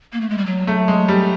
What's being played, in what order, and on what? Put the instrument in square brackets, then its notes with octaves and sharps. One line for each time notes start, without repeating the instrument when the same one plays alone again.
[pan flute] A#3
A3
G#3
G3
F#3
[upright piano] A3
G#3
G3